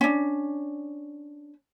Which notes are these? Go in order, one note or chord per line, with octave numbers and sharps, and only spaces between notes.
C#4 D4